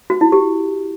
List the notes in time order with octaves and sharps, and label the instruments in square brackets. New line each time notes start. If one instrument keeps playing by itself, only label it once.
[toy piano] F#4
E4
G4